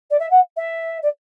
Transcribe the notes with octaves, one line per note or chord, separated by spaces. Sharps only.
D5
E5
F#5
E5
D5